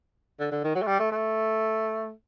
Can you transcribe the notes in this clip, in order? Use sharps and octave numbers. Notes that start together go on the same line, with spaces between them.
D3
D3
D#3
F#3
A3
G3
A3
A3